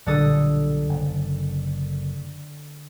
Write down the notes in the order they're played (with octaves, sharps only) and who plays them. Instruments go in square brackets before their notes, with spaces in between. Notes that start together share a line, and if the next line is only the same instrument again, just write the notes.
[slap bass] B1 A#2 G3 [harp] D3 A4 D#6
[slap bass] F#1